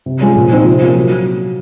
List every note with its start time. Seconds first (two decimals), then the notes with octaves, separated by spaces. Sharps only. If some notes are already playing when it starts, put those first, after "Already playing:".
0.06 C3
0.21 F3 G#3 C#4
0.36 A#2
0.51 F3 C4 D#4
0.66 C3
0.81 F3 A#3 C#4
0.96 F#3